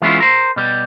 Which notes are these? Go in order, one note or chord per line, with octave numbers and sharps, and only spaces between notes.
E3 G#3 B3 C#4 E4 F4
A#4 C5
B2 G3